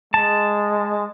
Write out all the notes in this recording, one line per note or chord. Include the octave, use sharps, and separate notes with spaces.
G#3 A5